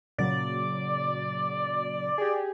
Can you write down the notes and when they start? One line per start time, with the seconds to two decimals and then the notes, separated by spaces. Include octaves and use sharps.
0.18 A#2 C#3 F#3 D5
2.18 G4 G#4